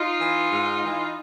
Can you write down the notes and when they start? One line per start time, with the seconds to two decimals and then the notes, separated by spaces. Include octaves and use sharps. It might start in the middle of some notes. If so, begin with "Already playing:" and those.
Already playing: D#4 F4
0.19 E3
0.49 G#2
0.81 E3